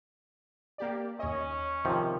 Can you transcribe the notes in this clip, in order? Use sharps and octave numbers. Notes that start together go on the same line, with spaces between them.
A#3 G4 D5
D#2 C#4 C#5 D#5
C3 D#3 F3